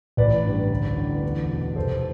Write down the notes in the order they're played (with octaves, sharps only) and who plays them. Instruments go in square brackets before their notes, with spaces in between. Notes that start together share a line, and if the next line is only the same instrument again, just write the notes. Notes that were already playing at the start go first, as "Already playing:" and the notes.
[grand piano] A1 B4 D5
G2
D2
D3
E2
B2
F1 A4 C5